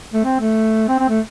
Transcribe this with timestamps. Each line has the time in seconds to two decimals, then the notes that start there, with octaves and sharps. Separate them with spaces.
0.14 A3
0.24 C4
0.40 A3
0.88 C4
0.99 C4
1.09 A3